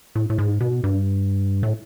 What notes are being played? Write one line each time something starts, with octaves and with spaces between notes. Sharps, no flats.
A2
A2
G#2
B2
G2
A2